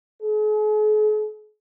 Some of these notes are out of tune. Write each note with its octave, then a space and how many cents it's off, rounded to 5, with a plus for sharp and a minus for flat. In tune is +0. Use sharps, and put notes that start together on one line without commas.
G#4 +45